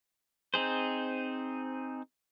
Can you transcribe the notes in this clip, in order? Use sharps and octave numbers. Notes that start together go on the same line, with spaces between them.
C4 D#4 G#4 C5